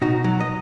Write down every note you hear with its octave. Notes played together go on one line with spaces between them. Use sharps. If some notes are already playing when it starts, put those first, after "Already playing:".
B2 D#4 F#4
F#3
D#5